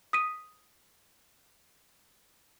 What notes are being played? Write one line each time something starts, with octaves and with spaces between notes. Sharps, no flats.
D#6 B6 D#7